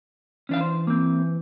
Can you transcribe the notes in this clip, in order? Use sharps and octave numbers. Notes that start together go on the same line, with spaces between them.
E3 C#4 D4 F5
C5
A#3 C4